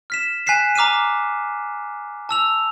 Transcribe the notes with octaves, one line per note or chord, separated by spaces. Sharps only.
F6 B6 E7
G#5 F#6 B6 C7 E7
A#5 D6 F6 C7 D#7
A5 E6 F7